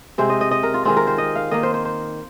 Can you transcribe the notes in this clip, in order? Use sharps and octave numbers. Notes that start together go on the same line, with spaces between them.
C3 G#3 C4 C5
D#5
D#5
D#5
A#4
F4
D#3 G#3 C4 F4
A#4
C5
D#5
F5
D#3 A#3 D#5
C5
C5
C5